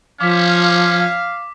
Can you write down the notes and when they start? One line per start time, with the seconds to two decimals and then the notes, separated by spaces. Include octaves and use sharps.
0.21 F3 C#4 F5 D6 B6